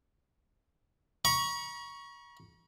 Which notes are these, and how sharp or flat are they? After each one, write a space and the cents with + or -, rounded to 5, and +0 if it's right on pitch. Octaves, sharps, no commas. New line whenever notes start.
A#5 +45 C#6 +0